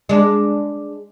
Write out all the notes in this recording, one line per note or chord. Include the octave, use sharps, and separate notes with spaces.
G#3 D4